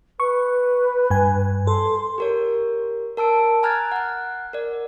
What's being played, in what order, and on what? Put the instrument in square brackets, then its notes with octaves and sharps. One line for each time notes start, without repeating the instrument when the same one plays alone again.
[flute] B4 [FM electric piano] C#6
[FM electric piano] G2 G#5
[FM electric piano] A4 [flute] C6
[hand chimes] G4 A#4 C#5
A#4 A5 E6 D7
G#5 A#5 F6 F#6 G#6 A6
F#5 F#6
A#4 D5